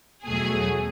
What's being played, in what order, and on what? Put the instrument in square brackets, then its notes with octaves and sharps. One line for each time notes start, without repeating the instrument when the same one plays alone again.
[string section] E2 B2 F#3 A3 G#4